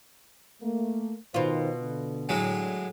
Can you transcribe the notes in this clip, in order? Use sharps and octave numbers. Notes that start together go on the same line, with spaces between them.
A3 A#3
B2 D#3 F4 C5
D3
A2 F#3 G#3